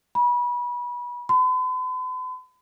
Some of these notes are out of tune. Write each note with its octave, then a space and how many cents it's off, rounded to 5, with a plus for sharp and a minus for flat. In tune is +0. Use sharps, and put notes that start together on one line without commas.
B5 -25
B5 +45